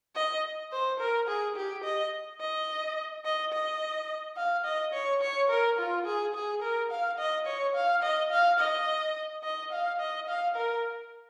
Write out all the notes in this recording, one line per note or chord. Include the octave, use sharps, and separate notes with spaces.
D#5
C5
A#4
G#4
G4
D#5
D#5
D#5
D#5
F5
D#5
C#5
C#5
A#4
F4
G#4
G#4
A#4
F5
D#5
C#5
F5
D#5
F5
D#5
D#5
F5
D#5
F5
A#4